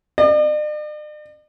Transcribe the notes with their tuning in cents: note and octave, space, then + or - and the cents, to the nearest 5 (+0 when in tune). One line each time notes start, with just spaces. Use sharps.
D5 +45